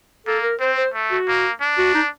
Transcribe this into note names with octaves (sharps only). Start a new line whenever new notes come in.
A#3 A4
A#4
C4 C5
C5
A3
F#4
A#3
D4
F#4
D#4